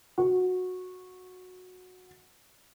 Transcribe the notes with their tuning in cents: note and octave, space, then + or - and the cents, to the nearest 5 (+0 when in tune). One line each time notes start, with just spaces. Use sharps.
F#4 -15